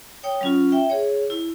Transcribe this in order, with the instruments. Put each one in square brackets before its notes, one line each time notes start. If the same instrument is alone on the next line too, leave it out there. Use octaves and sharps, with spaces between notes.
[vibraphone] C#5 G5 D#6
F#3 C#4 F4
E5 G5
G#4 C#5
E4